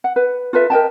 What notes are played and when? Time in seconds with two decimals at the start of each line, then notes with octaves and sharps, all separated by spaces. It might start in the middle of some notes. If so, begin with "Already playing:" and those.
0.04 F#5
0.16 B4
0.53 F4 A4 B4 E5
0.70 A#4 D#5 G5 A5